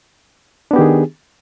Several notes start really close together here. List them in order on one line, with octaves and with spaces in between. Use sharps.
D4 B3 G4 D#3 G#4